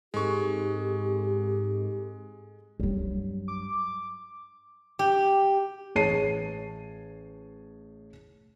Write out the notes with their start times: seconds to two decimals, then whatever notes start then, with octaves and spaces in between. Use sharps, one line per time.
0.14 G#2 G#3 C4 G4 A4 C#6
2.80 G2 F#3
3.48 D6
4.99 G4
5.95 A1 G#4 C#5 A5 C7 D#7